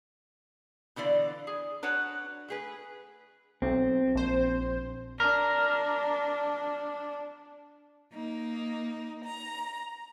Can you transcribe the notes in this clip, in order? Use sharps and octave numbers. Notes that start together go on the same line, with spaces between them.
B2 D3 E3 D5 F5
G#4
D4 F#4 B4 C#5 F#5 A5
A3 G#4 B4
B1 C4
A#1 C5
D4 A#4
A#3 D#4
A#5